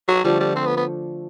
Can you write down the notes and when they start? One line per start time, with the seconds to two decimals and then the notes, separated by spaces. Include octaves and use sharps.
0.08 F#3
0.24 D3 F3 G3 A3 D4
0.40 G3
0.56 C4
0.67 B3
0.77 B3